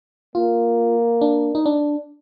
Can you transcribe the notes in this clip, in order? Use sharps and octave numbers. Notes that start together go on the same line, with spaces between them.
A#3 F4
D4
D#4
D4